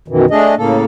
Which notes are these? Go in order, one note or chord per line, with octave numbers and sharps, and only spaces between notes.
F#2 B2 D#3 E3
A3 D4 G#4 D#5
A2 C#3 A#3 A4